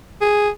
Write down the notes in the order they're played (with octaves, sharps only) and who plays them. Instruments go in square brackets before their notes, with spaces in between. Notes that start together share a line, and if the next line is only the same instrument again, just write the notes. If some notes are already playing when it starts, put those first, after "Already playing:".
[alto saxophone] G#4